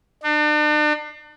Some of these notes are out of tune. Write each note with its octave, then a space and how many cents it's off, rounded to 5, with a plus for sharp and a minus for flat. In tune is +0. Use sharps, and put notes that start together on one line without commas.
D4 +40